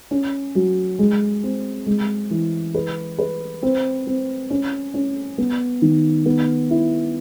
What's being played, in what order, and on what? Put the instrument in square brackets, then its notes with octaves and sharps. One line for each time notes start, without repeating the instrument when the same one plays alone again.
[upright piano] C#4
F#3
G#3
C4
G#3
E3
B4
B4
C4
C4
C#4
C#4
B3
D#3
B3
E4